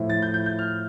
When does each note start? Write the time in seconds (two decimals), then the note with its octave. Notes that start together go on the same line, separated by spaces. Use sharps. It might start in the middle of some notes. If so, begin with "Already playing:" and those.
Already playing: A2 F3 A3 E4
0.10 A6
0.22 G6
0.34 G6
0.46 G6
0.59 F6